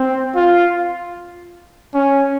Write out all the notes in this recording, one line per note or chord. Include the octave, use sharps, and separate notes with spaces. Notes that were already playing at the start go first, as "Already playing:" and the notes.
Already playing: C4
F4
C#4